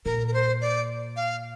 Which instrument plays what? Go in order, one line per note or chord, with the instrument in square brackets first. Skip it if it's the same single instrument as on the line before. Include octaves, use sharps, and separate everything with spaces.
[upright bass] A#2 [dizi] A#4
[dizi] A#4
C5
D5
F5